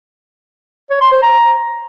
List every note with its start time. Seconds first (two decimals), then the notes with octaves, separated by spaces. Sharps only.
0.90 C#5
1.01 C6
1.12 C5
1.22 A#5